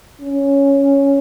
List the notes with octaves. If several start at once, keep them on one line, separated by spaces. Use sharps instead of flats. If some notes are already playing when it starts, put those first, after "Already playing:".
C#4